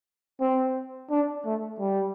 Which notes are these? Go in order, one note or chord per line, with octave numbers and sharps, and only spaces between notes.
C4
D4
A3
G3